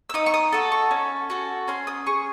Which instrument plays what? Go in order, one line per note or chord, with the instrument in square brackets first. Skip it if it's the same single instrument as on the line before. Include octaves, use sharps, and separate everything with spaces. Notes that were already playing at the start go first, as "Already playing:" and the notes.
[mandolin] E6
D#4 D#6
C#6
D#6
F#4 A4
C#6
C#4
F#4 A4
C#4 C6
D#6
G#4 C#6